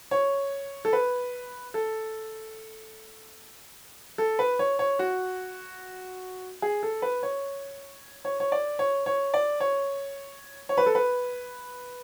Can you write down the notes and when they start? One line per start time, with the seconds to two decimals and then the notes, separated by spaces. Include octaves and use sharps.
0.11 C#5
0.85 A4
0.93 B4
1.74 A4
4.18 A4
4.39 B4
4.59 C#5
4.79 C#5
4.99 F#4
6.62 G#4
6.83 A4
7.02 B4
7.23 C#5
8.25 C#5
8.40 C#5
8.52 D5
8.79 C#5
9.06 C#5
9.34 D5
9.60 C#5
10.69 C#5
10.78 B4
10.86 A4
10.95 B4